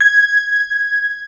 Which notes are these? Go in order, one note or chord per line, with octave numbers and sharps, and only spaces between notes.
G#6